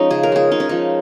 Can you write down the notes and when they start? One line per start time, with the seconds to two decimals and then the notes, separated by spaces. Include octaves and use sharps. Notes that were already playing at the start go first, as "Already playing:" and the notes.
Already playing: F3 G#3 C#4 D#4
0.11 C#3 G#4
0.23 A#4
0.32 G#3 G#4
0.52 C#3 D#4
0.60 C#4
0.69 F3 D#4